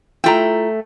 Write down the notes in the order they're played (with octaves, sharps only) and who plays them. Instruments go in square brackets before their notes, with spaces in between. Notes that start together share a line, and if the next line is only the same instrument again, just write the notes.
[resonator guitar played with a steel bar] A3 G5 [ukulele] E4 F4 A#5